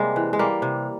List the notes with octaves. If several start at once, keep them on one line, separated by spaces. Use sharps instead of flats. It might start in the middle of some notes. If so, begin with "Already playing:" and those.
Already playing: C3 G3 G#3 A#3
E3
G#3
G3 A#3
C3